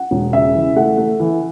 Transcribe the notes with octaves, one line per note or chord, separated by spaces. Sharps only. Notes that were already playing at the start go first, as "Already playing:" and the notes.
Already playing: F#5
E1
C#3 E5
E3
A3 F#5
A3
E3